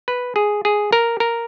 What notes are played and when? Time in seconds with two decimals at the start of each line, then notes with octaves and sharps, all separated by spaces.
0.08 B4
0.36 G#4
0.65 G#4
0.93 A#4
1.20 A#4